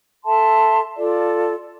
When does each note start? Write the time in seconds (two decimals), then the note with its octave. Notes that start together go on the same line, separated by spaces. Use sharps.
0.24 A4 E5 A5 C6
0.96 F4 A4 D5